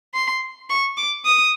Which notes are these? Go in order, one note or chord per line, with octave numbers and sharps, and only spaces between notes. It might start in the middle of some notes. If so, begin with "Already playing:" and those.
C6
C#6
D6
D#6